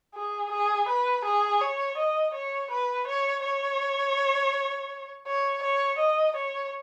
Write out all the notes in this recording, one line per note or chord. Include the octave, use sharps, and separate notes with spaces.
G#4
G#4
B4
G#4
C#5
D#5
C#5
B4
C#5
C#5
C#5
C#5
D#5
C#5